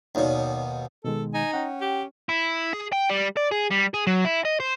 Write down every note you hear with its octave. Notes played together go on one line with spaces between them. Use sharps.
D#2 B2 D#4 C#5 D5
B2 D#3 G#3 A4
D#4 G#5
C#4 F#5 G5
G4
E4
G#4
G5
G3
D5
G#4
G3
G#4
F#3
E4
D#5
C5